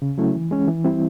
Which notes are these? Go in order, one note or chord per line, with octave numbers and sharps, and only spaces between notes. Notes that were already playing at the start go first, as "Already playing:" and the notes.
C#3
F#3 A3 C#4 E4
E3
G#3 C#4
E3
G3 C4 E4